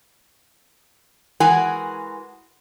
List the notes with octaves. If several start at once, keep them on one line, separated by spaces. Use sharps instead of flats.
E3 G#3 F#4 A#4 G#5